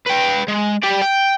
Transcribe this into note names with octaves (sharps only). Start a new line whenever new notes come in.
B4 G5
G#3
G4 D5
G5